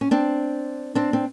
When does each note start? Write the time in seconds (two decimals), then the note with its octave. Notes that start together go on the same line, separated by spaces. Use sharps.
0.01 C#4
0.11 C4 D4
0.95 C4 D4
1.13 C4